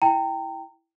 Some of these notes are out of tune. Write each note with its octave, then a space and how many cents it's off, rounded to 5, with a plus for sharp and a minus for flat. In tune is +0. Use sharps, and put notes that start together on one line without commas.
E4 +5 G5 +0 A#5 -30